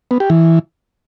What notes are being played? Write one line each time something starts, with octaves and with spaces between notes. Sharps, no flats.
B3
G4
E3